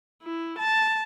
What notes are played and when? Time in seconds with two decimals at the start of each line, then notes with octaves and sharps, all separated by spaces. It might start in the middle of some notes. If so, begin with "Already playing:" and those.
0.23 E4
0.58 A5